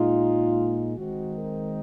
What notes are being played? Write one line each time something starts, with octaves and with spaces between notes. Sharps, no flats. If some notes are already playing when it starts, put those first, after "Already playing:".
Already playing: A#2 G#3 D#4 F4
D#3 G#3 C4 D#4 F#4
A#4